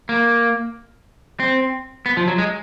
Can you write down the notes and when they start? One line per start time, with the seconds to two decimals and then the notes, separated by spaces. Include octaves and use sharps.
0.09 A#3
1.40 C4
2.06 B3
2.17 F3
2.28 F#3
2.38 G#3